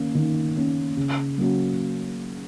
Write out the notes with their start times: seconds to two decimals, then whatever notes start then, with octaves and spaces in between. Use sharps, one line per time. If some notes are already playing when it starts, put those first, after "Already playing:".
Already playing: D#3 A#3 C#4
0.15 D#3
0.56 A#3 C#4
0.97 C#3
1.38 F#3 A#3 C#4 F#4